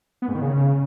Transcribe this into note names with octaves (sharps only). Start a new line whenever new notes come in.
B3
G#2
D#3
C#3